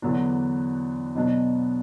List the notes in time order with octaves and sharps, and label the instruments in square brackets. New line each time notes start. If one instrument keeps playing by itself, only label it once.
[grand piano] E2 D3 F#3 B3 D4
B2 F#3 B3 D4